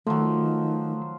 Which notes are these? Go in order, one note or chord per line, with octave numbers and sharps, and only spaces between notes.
D#3 F3 F#3 A3